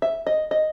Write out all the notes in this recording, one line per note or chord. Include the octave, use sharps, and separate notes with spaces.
E5
D#5
D#5